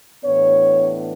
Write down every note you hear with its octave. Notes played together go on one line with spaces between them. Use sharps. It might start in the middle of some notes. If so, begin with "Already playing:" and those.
A2 E3 B3 D4 C#5